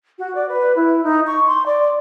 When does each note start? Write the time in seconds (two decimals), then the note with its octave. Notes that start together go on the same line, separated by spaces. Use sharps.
0.19 F#4
0.35 D5
0.49 B4
0.76 E4
1.04 D#4
1.27 C#6
1.47 C6
1.66 D5